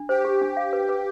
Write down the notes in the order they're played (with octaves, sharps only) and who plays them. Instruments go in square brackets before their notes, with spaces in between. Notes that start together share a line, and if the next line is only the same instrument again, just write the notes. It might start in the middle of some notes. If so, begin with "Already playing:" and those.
Already playing: [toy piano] D4
[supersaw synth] G4 [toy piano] C5
[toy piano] G4
D4
F5
B4
B4